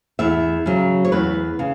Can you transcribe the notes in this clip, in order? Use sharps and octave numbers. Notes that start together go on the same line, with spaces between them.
E2 E5
C#3 F#3
C#5
E2 B4
C#3